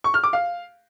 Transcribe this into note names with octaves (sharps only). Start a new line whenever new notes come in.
C#6
F6
D6
F5